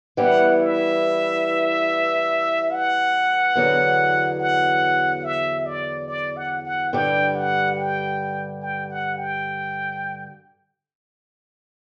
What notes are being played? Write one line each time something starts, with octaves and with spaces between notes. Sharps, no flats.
E3 G3 B3 E4 F#5
E5
F#5
E2 D3 F#3 B3
F#5
E5
D5
D5
F#5
F#5
G2 D3 G3 G5
F#5
G5
G5
F#5
G5